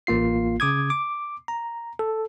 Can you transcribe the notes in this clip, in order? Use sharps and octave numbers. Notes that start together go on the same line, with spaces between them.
A1 A#3 F4 C7
C#3 D6 D#6 G#6
D6
A#5
A4